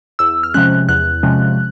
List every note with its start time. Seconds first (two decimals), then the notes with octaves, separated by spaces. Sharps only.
0.19 E2 E6
0.43 F6
0.54 C3 F3 G#3 C#4 F#6
0.89 E2 F#6
1.23 C3 F3 G#3 C#4